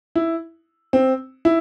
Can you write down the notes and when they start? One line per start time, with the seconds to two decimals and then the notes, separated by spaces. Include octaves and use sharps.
0.16 E4
0.93 C4
1.45 E4